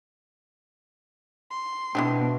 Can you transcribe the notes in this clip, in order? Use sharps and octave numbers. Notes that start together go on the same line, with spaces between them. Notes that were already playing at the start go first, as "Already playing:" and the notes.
C6
B2 E3 B3 C4 D4